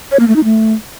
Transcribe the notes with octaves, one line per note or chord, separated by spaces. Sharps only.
C#5
A#3
A3
D#4
A3